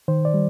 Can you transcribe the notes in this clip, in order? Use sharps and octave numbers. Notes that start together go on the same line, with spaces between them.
D#3 C5
D5
G3